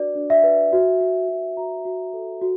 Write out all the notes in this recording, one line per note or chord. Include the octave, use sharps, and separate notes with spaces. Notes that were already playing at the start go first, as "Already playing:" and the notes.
Already playing: D4 F#4 B4 D5
D4
E5
B4
F#4
F#4
F#4
F#4 A#5
F#4
A4
F#4